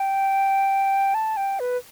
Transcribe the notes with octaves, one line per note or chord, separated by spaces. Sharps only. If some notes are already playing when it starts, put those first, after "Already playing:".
Already playing: G5
A5
G5
B4